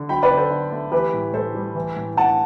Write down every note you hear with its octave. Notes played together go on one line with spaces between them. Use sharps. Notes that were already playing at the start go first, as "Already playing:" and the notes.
Already playing: D3
F#3 G5 B5
B4 D5
D3
A4 C5
D3
A3
E3 G4 B4
A2
A2 A4 C5
G3
E3
A2
A2 F#5 A5